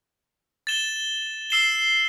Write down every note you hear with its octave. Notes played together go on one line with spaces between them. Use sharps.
A6 E7 G7
E6 C7 E7 G7